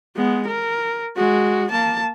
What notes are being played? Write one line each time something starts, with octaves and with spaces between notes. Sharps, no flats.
G#3 B3
A#4
G#3 F#4
A#3 A5